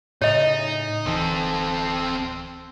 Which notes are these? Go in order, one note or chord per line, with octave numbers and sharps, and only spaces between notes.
A2 C#3 D#4 C#5 D#5
D1 E3 C4 A4